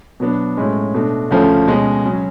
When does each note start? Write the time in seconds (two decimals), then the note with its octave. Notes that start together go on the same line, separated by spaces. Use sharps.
0.20 B2 F#3 B3 D4
0.57 A2 G#3 C#4
0.94 B2 A3 D4
1.31 D2 C#3 F3 A3 C#4
1.67 B2 G#3 C#4
2.05 C#3 F#3 C#4